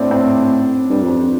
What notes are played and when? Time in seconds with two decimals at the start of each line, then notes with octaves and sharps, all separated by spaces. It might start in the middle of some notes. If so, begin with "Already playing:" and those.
Already playing: A2 C4 D4
0.11 C4
0.90 G2
1.03 F2